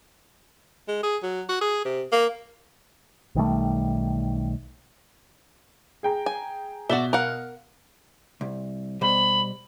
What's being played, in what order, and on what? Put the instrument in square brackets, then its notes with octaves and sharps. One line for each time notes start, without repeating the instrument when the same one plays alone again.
[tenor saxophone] G#3
G#4
F#3
F#4
G#4
C3
A#3
[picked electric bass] B1 D#3 G3 A3
[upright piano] G#4 G5 A#5
[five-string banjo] G#5
[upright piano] B2 G7 [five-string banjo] F#4 D5 E5
[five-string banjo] A#4 F5 F#5
[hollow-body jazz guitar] C2
[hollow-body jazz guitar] B2 G3 C5 [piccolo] B5